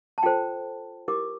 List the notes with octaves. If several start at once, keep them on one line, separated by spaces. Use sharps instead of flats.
A5
F4 A4 C5 G5
E4 G4 A#4 D6